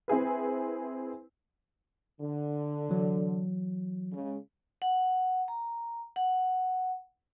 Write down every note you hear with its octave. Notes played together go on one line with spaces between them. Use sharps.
C4 E4 G#4 B4
D3
E3 F#3
C#3 G#3
F#5
A#5
F#5